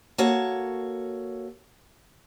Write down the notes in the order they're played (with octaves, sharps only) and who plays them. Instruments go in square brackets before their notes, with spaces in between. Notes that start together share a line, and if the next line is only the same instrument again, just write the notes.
[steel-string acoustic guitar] A#3 F#4 A4 C#5